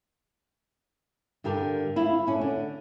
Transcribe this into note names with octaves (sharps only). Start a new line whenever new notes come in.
G2 D3 G4 A#4
G3 E4 F4
A3 C#4 D4
D3